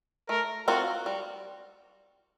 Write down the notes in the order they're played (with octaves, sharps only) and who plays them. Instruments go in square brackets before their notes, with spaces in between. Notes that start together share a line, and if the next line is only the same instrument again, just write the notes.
[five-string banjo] A3 [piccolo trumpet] A#4
[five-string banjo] C4 F4 A#4 [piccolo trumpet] F#4
[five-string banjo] G3